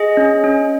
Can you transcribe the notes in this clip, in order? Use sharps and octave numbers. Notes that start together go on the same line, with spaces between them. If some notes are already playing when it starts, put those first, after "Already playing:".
Already playing: G#4 D#5
C#4
C#4